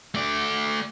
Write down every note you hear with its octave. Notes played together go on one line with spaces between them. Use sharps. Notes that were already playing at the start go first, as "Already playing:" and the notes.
A3 D5